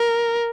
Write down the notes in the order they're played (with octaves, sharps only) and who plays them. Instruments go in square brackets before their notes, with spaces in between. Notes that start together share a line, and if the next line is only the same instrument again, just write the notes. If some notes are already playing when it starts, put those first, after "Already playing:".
Already playing: [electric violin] A#4